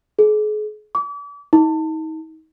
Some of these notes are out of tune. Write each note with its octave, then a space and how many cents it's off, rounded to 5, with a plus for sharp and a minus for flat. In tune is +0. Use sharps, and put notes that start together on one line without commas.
G#4 +40
D6 -40
D#4 +35